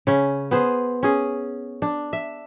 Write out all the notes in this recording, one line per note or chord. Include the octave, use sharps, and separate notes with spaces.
C#3 C#4
B3 G#4 C5
C#4 G#4
D4
E5